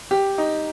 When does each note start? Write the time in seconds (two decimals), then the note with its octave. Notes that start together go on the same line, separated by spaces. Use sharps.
0.11 G4
0.38 D#4